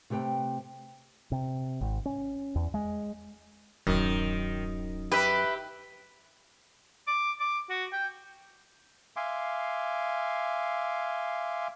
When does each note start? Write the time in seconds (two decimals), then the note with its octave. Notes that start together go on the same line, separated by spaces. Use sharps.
0.10 C3 A3 G4 B4 G5
1.32 C3
1.81 G#1
2.06 C#4
2.55 E2
2.74 G#3
3.87 D1 F#2 D#3
5.12 G4 B4 E5
7.07 D6
7.40 D6
7.70 F#4
7.92 G5
9.16 E5 F5 G#5 C6 D6